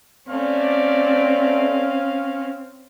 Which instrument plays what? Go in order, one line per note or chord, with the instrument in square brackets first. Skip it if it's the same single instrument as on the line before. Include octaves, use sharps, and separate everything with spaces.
[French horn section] A3 D5 [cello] C4 [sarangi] C#4 [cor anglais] F5